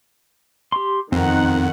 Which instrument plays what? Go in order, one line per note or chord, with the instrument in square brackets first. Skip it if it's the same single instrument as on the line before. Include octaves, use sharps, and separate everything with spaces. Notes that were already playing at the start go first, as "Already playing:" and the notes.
[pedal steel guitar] G4 C6
[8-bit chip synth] F2 [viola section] D#3 F#5 [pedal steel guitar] C4 A#5